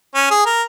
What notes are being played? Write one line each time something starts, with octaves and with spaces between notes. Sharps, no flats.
C#4
G#4
A#4